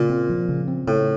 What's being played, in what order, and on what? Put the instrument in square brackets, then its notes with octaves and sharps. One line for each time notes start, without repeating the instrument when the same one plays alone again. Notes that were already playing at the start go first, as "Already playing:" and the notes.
Already playing: [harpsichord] A#2 [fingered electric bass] C#3
[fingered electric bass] C4
F3
C#3
C4
[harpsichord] A2 [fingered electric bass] C#3